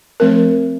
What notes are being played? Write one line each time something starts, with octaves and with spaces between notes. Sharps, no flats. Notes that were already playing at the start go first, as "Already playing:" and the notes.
F3 A3 C4 A#4